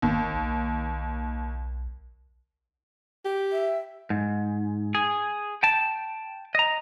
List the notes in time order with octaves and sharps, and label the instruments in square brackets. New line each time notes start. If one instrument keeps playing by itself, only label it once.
[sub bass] G1 [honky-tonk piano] D#2
[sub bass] B1
[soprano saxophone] G4
[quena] E5
[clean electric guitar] G#2
G#4
G5 A5
D#5 A#5